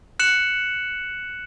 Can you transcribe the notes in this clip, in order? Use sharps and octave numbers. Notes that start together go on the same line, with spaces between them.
F#6 C#7 E7 F#7